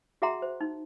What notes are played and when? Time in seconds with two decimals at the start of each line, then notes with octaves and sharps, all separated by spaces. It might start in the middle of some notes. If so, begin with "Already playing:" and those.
0.22 F#4 G#4 E5 F#5 A#5 C6
0.42 C5
0.61 D#4